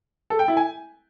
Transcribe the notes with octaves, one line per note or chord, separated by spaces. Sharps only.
A4
G5
E4
G#5